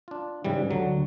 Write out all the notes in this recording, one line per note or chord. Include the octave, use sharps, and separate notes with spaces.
D4 F4
G#2 C#3 E3 G3
D2 D3 F#3